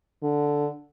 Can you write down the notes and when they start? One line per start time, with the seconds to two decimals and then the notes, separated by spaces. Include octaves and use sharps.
0.23 D3